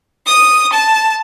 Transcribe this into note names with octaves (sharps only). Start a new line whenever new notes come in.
D#6
A5